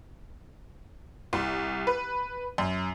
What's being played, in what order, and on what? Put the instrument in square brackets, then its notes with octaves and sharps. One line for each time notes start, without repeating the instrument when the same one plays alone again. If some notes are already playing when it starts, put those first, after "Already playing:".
[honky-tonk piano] C2
B4
F#2